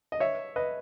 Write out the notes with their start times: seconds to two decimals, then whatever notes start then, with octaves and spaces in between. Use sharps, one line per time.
0.12 D#5
0.20 C#5 E5
0.56 B4 D#5